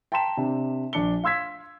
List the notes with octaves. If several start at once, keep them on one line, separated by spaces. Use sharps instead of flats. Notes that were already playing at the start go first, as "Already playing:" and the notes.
G5 A5 A#5 C6 B6 E7
C3 D4
A#1 D4 C#7 G7
F5 C6 E6 G#6 B6